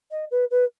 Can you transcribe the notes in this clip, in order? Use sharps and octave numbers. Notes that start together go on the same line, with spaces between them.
D#5
B4
B4